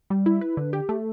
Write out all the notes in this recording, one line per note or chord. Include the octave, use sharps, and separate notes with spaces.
G3
E4
B4
D3
G4
A3